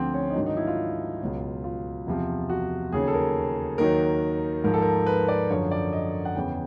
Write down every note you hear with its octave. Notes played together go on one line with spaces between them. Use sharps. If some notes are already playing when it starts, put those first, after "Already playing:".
Already playing: D2 D3 F3 C4
C#4
D#4
G#2 D#3 F#3 D4
D#4
E4
F4
C#2 B2 F#3
F4
E2 C3 F3
F#4
D#2 C#3 F#3 G#4
A4
A#4
D#2 D#3 F#3 A#4
G#2 F3 A#4
A4
A#4
B4
D5
F#2 D3 F3 C#5
D5
D#5
F#5
E2 C#3 E3 G5